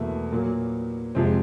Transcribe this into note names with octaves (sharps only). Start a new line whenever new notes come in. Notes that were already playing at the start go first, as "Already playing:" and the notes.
Already playing: E2 B2 F#3 A3 A#3
A#2 F#3 A#3
F2 C3 F3 G#3 C4